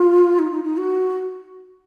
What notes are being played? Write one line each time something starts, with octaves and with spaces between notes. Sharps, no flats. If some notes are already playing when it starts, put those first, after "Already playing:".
Already playing: F4
D#4
D#4
D#4
F#4